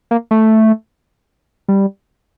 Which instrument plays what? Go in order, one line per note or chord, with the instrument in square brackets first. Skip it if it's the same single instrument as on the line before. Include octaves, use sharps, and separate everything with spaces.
[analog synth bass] A#3
A3
G3